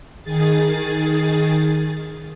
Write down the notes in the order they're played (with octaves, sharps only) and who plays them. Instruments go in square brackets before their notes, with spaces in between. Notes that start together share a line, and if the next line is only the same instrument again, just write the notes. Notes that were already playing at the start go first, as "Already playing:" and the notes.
[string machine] D#3 G#4 A6